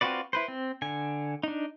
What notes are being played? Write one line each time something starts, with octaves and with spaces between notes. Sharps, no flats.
C4 F4 F#4 B4 D5
E4 B4 C5
C4
D3 G#5
D4 D#4